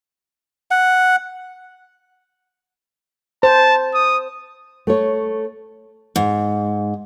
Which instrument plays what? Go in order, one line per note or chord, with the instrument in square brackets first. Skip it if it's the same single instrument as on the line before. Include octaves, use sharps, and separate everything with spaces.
[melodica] F#5
[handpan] C5 [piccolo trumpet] A5
[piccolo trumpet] D#6
[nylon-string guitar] A3 C#5
[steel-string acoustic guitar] G#2